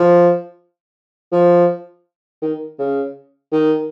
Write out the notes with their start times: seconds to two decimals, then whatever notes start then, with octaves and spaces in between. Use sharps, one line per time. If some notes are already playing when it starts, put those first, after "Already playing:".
Already playing: F3
1.32 F3
2.42 D#3
2.79 C#3
3.52 D#3